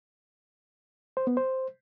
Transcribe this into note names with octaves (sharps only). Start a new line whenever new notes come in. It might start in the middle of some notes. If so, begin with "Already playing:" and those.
C5
B3
C5